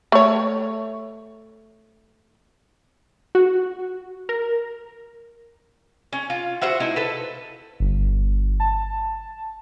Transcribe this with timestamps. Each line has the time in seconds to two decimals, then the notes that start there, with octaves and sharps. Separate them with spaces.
0.12 A3 C#5
3.35 F#4
4.29 A#4
6.13 C#4
6.30 F4
6.62 F#4 C5 E5 F#5
6.80 A3 D#4 E4
6.96 A4 B4
7.80 G1
8.60 A5